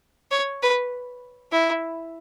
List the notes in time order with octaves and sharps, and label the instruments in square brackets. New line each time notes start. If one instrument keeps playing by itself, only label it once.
[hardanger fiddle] C#5
B4
E4